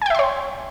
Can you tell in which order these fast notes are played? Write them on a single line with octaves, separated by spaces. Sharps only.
G#5 G5 E5 C6 C#5